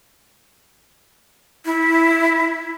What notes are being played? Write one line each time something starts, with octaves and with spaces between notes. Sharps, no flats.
E4